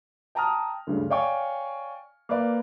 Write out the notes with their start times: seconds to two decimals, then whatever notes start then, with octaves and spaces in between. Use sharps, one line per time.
0.35 G5 A5 A#5 D#6 F6
0.87 D2 G2 C#3
1.10 C#5 D5 F5 G5 G#5 C#6
2.29 A#3 B4 D5 F5